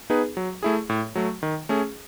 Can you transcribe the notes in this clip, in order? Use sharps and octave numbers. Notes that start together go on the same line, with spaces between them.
B3 D#4 G#4 B4
F#3
A3 E4 G#4
A2
F#3 A3
D#3
A3 C#4 G#4